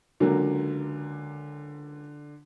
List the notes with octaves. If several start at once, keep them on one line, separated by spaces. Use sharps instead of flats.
C#2 D3 F#3 A#3